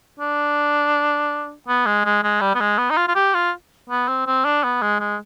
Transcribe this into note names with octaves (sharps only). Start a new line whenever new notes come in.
D4
B3
G#3
G#3
G#3
G3
B3
G#3
B3
D#4
F4
F4
G4
F4
B3
C4
C4
D4
B3
G#3
G#3